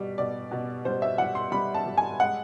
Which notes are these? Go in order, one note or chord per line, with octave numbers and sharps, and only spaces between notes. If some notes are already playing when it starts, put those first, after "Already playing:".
Already playing: B2 G3
B2 D5
B2
G3 C5
E5
G3 F#5
C6
G3 B5
A5
G3
G#5
G#3 F#5